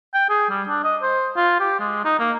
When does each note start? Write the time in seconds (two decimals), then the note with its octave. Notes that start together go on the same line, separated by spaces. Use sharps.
0.14 G5
0.30 G#4
0.50 G3
0.68 D4
0.84 D#5
1.02 C5
1.36 F4
1.60 G4
1.80 G#3
2.04 D#4
2.19 A#3